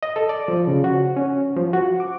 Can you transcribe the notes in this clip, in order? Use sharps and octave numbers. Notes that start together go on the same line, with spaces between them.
D#5
A4
D5
F3
C#3
F#4
C#4
F3
F#4
D6